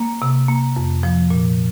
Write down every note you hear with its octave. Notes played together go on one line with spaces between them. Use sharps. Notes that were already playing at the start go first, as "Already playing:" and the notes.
Already playing: A#3
C3
A#3
F2
F3
A#2